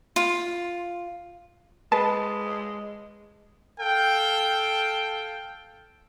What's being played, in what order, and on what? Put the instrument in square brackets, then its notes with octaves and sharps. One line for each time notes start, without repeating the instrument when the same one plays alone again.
[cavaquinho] F4
[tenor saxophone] G#3 [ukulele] B4 [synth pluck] A5
[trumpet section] A4 F5 G5